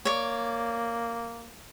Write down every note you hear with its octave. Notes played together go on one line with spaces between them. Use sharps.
A#3 C#5 D5